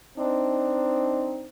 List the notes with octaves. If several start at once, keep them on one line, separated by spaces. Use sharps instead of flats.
C4 D4 D#4